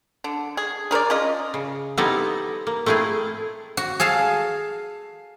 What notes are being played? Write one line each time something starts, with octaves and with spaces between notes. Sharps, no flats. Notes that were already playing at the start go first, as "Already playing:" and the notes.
D3
G#4
G#4 A#4 C5 D5
C#4 F4 D#5
C#3
G3 B3 C4 D#4 E4 A4
A#3
A3 C4 E4 F4 G#4
F#4
G#4 A4 F5 A5